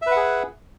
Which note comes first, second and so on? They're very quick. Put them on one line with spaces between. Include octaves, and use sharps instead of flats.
E5 B4 F#5 G#4